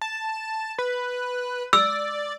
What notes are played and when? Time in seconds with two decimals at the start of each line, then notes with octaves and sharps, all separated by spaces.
0.01 A5
0.78 B4
1.73 D5 E6